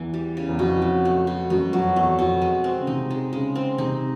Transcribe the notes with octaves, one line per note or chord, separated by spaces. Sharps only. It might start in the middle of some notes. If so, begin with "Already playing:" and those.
Already playing: E2 E3
G3
C#3
E2
F2 B2
F#3
A3
B2
F#2 B2
F2 F#3
E2 A3
F2 B2
G#3
C4
C#3
C3 D#4
G#3
C#3 G#3
C4
C3 D#4